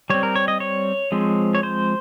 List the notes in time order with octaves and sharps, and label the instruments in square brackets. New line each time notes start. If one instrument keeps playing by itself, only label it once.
[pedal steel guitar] G3 C4 C#5
A#4
C#5
D#5
C#5
F3 G#3 C4
C#5
C5